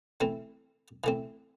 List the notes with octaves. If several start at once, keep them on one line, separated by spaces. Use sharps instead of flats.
E3 A3 C4
E3 A3 C4